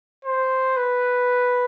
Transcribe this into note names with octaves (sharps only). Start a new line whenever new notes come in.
C5
B4